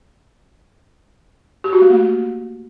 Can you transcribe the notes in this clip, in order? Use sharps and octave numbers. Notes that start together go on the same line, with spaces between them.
G4
F#4
A3
A#3